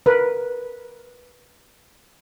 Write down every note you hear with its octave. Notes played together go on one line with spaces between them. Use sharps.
A#4 B4